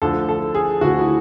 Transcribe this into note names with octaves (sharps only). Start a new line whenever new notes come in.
D2 D3 F3 A4
A4
G#4
D2 D3 F3 F#4
E4